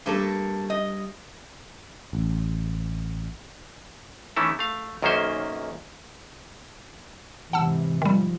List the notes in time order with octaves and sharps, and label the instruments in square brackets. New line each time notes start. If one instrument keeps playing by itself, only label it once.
[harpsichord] G2 [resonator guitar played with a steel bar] A3 A#3 A4
[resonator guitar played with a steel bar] D#5
[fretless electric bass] A1
[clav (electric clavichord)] D#3 E3 A3 C#4 E4
A3 F5
B1 F#2 D#3 A#3 C#4 C5
[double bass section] G#2 C3 E3 [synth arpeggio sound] F#5 A5 E6
[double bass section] G#2 F3 [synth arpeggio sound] D#3 G3